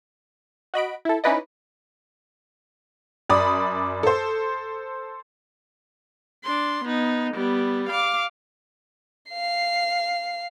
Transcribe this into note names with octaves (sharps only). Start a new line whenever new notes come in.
F#4 D#5 B5 D7
E4 A4
C#4 D#4 E4 B4 D5 D#5
F#2 D5 B5 D#6
A4 C5
D4 C6
B3 D#4
G3 B3
F5 D6
F5 C7